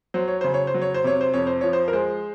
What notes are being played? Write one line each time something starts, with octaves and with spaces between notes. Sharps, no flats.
F#3 C5
C#5
C#3 C5
C#5
C5
F#3
C#5
C5
C3 C#5
C5
F2 C#5
C5
F3 C#5
C5
A#4
G#3 C5